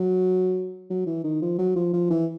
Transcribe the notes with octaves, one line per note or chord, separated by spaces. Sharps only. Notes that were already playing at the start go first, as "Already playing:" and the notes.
Already playing: F#3
F#3
E3
D#3
F3
F#3
F3
F3
E3